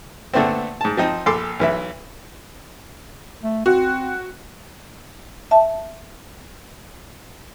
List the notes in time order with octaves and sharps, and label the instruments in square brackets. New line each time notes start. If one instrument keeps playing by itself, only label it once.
[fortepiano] A#2 D3 A3 B3 C4
G#2 A5
F3 C4 D#4
A#1 A4 C6 D6
B1 E3 E5
[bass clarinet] A3
[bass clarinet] C4 [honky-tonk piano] F#4
[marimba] E5 A5